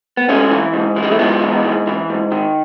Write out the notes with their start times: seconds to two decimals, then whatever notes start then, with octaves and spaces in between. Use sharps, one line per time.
0.17 B3
0.29 G#2 A3 C#4
0.51 E3
0.73 G#2
0.96 E3
1.03 G#3
1.11 A3
1.19 G#2 G#3 B3
1.41 E3
1.64 G#2
1.87 E3
2.10 G#2
2.32 D#3